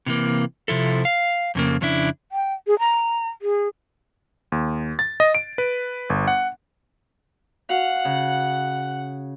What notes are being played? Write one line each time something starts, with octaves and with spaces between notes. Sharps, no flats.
C3 E3 A#3
C3 F3 E4 A4
F5
F2 C#3 A#3
F2 C#3 D4 E4
G5
G#4
A#5
G#4
D#2
A6
D#5
D7
B4
G1
F#5
F#4 F5 F#5
C#3